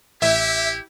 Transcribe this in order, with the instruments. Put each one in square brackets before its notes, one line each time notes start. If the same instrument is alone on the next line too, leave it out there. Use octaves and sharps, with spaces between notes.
[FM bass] A1 [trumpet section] E4 G4 [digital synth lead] E5